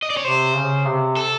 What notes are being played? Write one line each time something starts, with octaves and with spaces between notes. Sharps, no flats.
D#5
D5
C#5
C3 C5
C#3
C3
A4